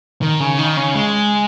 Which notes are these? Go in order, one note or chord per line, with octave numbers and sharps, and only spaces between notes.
D#3
C#3
D#3
C#3
G#3